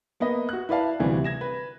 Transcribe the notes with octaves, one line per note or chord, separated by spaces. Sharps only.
A#3 B3 B4 D#5
F#4 F#6
E4 B4 D5 F5 A5
D2 C3 E3 G3 D4
G#6 A#6 E7
B4